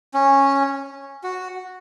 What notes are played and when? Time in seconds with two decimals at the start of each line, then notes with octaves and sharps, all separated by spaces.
0.14 C#4
1.23 F#4